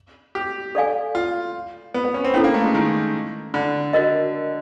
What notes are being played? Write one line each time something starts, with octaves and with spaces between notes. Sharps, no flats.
G4
A4 D5 F5 G#5
F4
B3
B3
C#4
C4
B3 C#4 E4 A4
A#3
A3
G#3
D#3
D3
F#4 A#4 D#5